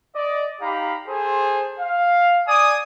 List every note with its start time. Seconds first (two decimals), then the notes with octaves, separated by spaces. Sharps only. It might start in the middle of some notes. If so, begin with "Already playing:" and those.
0.15 D5 D#5
0.60 D#4 G4 F5 A#5 B5
1.08 G#4 A4 C5
1.79 F5
2.47 D5 G#5 D6 D#6